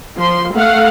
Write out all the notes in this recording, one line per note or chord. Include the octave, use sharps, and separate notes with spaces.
F3 C6
A3 F5 F#5